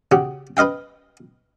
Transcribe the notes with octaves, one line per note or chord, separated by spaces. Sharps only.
C#3 F#4 G4
B4 C5 D#5 F5 G5